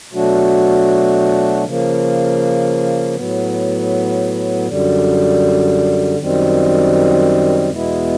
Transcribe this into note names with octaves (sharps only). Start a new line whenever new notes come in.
B2 F#3 A3 D4 F#4
C#3 F3 A#3
A2 F#3 B3
F#2 D3 G3
F#2 D#3 G3 C4
E2 B2 G#3 B3 E4